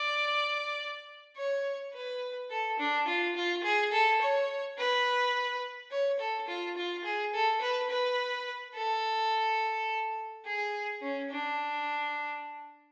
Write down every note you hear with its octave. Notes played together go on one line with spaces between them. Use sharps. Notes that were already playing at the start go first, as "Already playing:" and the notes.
Already playing: D5
C#5
B4
A4
D4
F4
F4
G#4
A4
C#5
B4
C#5
A4
F4
F4
G#4
A4
B4
B4
A4
G#4
C#4
D4